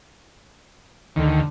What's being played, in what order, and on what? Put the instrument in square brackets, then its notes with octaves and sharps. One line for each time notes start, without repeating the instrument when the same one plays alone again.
[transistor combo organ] D2 D#3 [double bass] D3